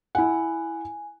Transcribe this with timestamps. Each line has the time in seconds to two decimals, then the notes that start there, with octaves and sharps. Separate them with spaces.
0.15 E4 F#5 G#5